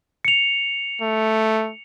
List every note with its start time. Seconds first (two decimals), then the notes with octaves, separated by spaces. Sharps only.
0.25 C#7 F7
1.01 A3